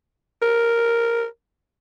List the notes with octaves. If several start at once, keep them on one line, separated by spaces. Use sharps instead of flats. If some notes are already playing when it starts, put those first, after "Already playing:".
A#4